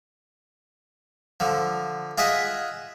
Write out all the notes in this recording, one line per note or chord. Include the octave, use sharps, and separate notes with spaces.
D3 F3
F4 G#4 D#5 E5 F#5